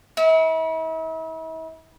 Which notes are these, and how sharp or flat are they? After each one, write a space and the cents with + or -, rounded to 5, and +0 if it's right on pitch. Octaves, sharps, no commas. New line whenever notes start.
E4 -40